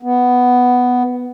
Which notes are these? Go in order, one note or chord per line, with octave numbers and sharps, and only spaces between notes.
B3